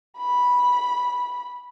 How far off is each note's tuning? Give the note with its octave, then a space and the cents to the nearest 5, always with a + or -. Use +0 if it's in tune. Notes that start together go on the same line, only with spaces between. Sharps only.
B5 -10